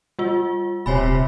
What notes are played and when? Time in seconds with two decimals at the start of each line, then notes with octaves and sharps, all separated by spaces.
0.19 G3 F4
0.86 D#1 C3 C#5 G#5 B5